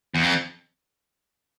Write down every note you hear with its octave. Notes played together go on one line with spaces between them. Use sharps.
E2
F2